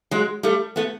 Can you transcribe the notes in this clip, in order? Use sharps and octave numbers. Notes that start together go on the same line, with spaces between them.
F#3 G#3
G3 A3
A3 B3